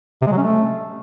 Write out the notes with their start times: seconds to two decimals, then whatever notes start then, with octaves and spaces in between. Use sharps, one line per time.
0.22 C3
0.27 G#3
0.32 F#3
0.37 C#4
0.42 A3